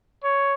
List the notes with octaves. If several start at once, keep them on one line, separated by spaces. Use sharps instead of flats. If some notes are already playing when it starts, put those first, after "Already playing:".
C#5